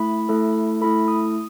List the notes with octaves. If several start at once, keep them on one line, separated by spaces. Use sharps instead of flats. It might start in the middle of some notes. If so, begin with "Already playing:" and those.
Already playing: A3 E4 B5
A3 E4 A4
A3 E4 A4 B5
D#6